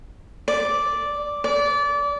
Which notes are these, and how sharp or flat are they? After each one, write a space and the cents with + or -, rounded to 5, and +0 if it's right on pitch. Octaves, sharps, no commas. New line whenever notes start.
D5 -5
D5 -25